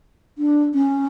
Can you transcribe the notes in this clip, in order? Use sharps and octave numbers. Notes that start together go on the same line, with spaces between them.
D4
C#4